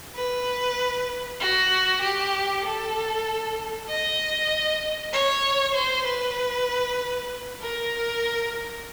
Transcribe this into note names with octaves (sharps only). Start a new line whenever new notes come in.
B4
F#4
G4
A4
D#5
C#5
C5
B4
A#4